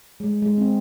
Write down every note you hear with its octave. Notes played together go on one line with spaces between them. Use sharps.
G#3
G#3
C4